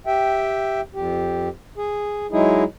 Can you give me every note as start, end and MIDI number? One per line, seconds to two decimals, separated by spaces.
0.06 0.81 67
0.06 0.81 76
0.06 0.81 79
0.94 1.49 41
0.94 1.49 67
1.77 2.27 68
2.32 2.64 54
2.32 2.64 56
2.32 2.64 63
2.32 2.64 64
2.32 2.64 68